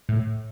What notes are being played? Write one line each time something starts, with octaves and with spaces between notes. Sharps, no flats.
A2